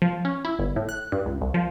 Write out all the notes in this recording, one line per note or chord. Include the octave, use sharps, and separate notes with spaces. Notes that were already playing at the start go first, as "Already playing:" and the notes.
F3
C#4
E4
G1
A2
F#6
G2
C#2
C2
F3